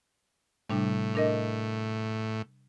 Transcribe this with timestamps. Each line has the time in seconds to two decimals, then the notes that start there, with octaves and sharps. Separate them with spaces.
0.69 A2 C3 G3 D4
1.15 D4 A#4 D#5